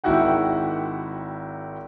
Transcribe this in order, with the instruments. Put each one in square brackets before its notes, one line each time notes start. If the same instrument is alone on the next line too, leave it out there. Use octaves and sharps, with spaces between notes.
[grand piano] G#1 D#3 E4 F#4 F#5 G5